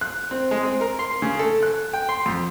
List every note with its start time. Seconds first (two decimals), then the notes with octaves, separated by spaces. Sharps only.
0.01 F#6
0.31 C4
0.51 G#3
0.63 C4
0.81 A#4
0.99 C6
1.22 C#3
1.39 A4
1.63 F#6
1.93 G5
2.09 C6
2.26 F2